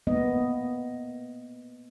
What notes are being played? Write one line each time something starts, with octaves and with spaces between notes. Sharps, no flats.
A#3 B3 D#5